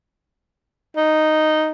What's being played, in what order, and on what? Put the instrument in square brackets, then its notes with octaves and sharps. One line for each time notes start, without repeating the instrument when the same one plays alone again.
[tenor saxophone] D#4